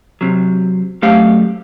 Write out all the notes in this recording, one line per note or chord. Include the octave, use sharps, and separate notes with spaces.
C3 F#3
F#2 A3 G4 F5